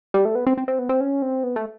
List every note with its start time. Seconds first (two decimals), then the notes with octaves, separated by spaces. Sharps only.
0.14 G3
0.25 A3
0.35 B3
0.47 C4
0.58 C4
0.68 C4
0.79 B3
0.89 C4
1.01 C#4
1.22 C4
1.44 B3
1.56 A3